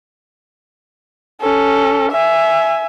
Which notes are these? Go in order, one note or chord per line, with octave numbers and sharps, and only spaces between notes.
C#4 A4
E5 G#5